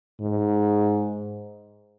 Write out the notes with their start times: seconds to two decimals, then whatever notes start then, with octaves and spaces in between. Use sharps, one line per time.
0.21 G#2